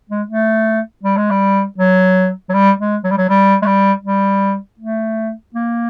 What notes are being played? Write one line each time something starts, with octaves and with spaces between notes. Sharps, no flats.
G#3
A3
G3
G#3
G3
F#3
F#3
G3
G#3
F#3
G3
F#3
G3
G#3
G3
G3
A3
A#3